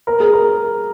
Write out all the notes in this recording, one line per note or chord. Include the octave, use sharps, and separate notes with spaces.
A#4
G#4
A#4